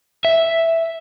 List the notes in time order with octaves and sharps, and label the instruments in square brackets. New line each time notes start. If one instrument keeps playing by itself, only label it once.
[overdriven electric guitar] E5